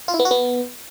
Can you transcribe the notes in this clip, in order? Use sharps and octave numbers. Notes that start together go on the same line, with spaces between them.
F4
E4
B3
F#4
B3